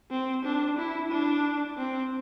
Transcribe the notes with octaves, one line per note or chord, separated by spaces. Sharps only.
C4
D4
E4
D4
C4